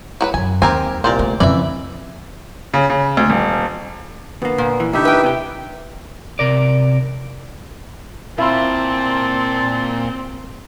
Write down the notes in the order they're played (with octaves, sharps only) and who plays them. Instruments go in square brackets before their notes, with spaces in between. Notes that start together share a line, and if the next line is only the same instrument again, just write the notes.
[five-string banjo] F#3 A#4 B4
[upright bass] F#2 [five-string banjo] G#5
[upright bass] D#2 [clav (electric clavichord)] C4 [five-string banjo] G4 A#4 G#5
[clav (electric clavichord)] C2 A#2 [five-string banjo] C5 D5 A#5
[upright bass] A3
[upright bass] F2 C#3 [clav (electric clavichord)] E3 [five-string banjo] D5 E5
[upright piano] C#3
C#3
D2
D#1
[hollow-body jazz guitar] D2 A#3 [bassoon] B3
[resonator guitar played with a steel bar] A#2
[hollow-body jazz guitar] E3
[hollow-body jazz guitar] A2 D3 [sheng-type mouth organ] D#4 G4 E5 [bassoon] E4
[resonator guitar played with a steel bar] B4 G5
[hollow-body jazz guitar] C3 G4
[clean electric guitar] C3 A#4 D5
[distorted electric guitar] A#2 [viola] C4 [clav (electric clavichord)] E4 F4 [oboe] A5